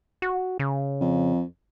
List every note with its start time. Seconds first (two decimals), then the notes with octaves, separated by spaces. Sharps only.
0.22 F#4
0.59 C#3
1.01 F2